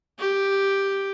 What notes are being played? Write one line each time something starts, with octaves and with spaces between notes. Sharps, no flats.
G4